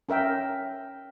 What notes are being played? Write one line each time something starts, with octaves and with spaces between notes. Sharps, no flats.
C#4 A#4 E5 G5